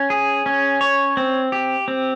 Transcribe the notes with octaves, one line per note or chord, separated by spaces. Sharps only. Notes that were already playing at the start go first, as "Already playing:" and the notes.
Already playing: C#4
G#4
C#4
C#5
C4
G4
C4